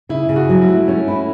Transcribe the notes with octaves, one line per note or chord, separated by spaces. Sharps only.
C#3 E4
C#3
F#4
F#3
E4
A3
A3 C#4
E4